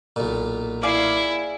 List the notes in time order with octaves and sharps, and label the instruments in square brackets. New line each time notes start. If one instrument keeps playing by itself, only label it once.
[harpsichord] B1 A#2
[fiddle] E4 [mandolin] G#4 D5 F5